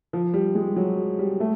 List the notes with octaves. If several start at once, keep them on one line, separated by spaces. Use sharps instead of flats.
F3
G3
G#3
F#3
G3
A3